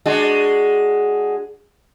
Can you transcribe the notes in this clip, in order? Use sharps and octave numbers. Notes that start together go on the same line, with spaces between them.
G#3 D4 F#4